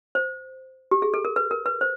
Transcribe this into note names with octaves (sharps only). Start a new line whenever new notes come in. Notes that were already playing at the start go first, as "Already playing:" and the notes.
C5
G4
G#4
A4
A#4
B4
A#4
B4
C5